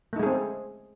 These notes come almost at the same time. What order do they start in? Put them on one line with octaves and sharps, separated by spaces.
A3 D#4 G#3 G#4 C4